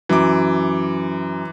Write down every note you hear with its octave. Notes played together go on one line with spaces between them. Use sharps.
F#2 E3 D6